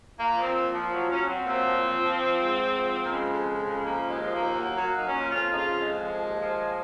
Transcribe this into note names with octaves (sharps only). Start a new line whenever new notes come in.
A#2 A#3
F3
C4
A#2
F3
F#3
F#3 C#4
F#3 C4
A#2 C4
F3
F3
F3
F3
G#2
G#2
F3
F3
A#3
C#3 G#3
F2
F2
C#3
F3 A#3
D#2
G#3
F3
D#2 A#3
F#3 A#3
F#3
A#3
F#3 D#4
C#4
A#2
F2 F4
C#3 D#4
F4
F2
G#3
F2
F3
D#2
F3